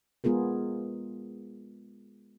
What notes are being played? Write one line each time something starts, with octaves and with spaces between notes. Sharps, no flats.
G#3 B3 F4 G#4 A#4